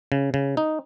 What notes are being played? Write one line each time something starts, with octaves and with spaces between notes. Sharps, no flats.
C#3
C#3
D#4